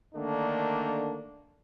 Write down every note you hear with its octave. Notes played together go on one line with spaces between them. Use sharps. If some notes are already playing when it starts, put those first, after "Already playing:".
D3 D#3 A3 A#3 D4